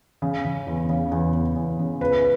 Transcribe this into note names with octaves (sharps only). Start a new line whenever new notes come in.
C#3
C#3
E2
C#3
E2
E2
E2
C#3
C#2 B4